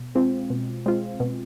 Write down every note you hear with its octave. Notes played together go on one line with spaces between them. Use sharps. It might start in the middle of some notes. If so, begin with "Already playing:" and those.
Already playing: B2
G#3 C4 F4
B2
G#3 C4 F4
B2